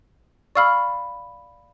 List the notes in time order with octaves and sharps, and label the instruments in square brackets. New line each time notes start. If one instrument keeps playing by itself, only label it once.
[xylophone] D5 F5 B5 [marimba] C#6 E6 F6